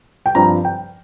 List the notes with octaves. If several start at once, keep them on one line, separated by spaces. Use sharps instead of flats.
G5
G2 F3 C4 A#5
G5